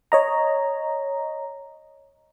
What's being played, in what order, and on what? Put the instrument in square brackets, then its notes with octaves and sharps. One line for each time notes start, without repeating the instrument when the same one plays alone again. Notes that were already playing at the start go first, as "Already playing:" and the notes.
[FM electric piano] C#5 D#5 A#5